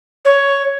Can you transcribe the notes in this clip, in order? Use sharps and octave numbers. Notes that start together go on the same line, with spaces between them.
C#5